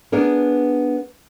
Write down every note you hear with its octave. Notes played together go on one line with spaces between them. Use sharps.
B3 D4 G#4 A#4